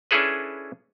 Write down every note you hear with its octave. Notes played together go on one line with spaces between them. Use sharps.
C#4 D4 E4 G#4 A4 B4